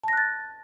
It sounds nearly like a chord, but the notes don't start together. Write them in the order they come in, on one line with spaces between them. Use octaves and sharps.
A5 A#6 F#6 A6